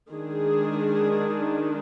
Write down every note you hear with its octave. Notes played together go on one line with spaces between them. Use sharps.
D#3 G#3 D4 G#4